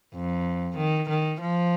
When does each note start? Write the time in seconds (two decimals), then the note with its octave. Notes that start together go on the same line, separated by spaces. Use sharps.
0.15 F2
0.77 D#3
1.09 D#3
1.41 F3